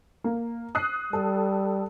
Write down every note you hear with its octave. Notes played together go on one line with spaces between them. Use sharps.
A#3
D#6 F#6 C7
G3 A4